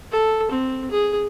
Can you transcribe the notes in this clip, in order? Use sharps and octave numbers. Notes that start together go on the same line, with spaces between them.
A4
C4
G#4